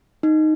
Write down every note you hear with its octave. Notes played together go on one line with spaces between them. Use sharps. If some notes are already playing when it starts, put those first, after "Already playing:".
D#4